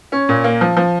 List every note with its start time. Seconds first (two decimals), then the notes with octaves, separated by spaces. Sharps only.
0.12 C#4
0.29 A#2
0.44 A#3
0.61 F3
0.77 F3